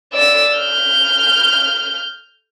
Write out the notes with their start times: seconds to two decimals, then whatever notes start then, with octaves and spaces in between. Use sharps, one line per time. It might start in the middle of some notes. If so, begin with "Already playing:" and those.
0.13 D5 E6
0.57 F6 G6